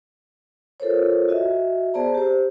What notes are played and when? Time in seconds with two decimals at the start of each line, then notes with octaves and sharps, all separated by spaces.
0.80 F4 A4 A#4 C5 C#5
1.28 F#4 D#5 E5
1.94 B3 G#4 C5 D5 A5 A#5
2.15 G4 C5